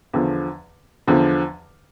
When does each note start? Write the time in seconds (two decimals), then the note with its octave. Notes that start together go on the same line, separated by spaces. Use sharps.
0.14 E2 D3 F3
1.08 E2 D3 F3